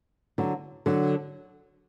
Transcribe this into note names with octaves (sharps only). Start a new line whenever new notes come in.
D3 F#3
D3 F#3